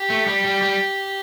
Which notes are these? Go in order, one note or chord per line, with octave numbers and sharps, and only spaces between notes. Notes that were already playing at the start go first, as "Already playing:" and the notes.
Already playing: G4
A3
G3
G3
G3